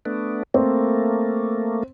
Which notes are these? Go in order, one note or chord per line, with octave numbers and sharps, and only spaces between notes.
A3 B3 D4
A3 A#3 C4